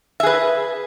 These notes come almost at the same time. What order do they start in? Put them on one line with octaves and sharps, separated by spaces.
E5 G#4 B4